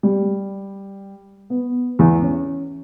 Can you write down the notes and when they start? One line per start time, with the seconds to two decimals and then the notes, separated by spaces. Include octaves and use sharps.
0.03 G3
1.50 B3
1.99 E2
2.23 C#4